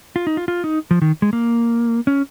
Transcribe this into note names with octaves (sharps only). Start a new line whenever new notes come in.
F4
D#4
F4
F4
D#4
F3
D#3
G#3
A#3
C#4